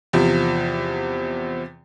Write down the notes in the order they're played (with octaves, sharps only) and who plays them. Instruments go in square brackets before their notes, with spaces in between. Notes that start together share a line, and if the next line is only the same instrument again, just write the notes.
[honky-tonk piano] E2 C3 F3